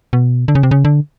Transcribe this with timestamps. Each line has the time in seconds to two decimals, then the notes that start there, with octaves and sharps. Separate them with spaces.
0.13 B2
0.48 D3
0.55 C#3
0.63 C3
0.71 C#3
0.85 D3